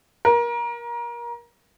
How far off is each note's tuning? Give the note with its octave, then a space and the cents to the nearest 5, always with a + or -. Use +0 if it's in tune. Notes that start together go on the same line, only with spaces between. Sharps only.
A#4 +25